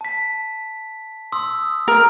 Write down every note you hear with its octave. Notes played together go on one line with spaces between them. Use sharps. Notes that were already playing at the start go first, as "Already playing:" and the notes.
A5 B6
C6 D#6 E6
A#4 F6